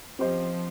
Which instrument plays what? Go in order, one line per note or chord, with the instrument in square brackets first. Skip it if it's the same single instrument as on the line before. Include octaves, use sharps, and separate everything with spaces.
[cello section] F3 [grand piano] C4 G4 C5 D#5